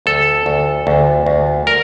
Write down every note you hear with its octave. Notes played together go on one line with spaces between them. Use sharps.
D2 A4
D2
D2
D2
A#4